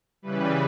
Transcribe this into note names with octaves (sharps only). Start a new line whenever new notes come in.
C#3 E3 G3 B4